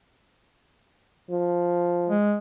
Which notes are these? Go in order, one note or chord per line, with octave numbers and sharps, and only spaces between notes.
F3
G#3